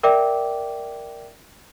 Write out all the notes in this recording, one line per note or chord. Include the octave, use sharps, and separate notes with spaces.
A#4 D5 E5 G5 D6